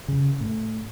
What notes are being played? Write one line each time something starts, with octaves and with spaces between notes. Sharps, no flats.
C#3
A2